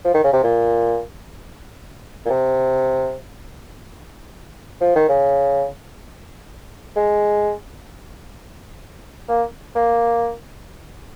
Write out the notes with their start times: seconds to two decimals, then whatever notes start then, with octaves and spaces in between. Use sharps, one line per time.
0.05 F3
0.14 D#3
0.24 C#3
0.33 C3
0.43 A#2
2.25 A#2
2.30 C3
4.81 F3
4.95 D#3
5.09 C#3
6.96 G#3
9.29 A#3
9.75 A#3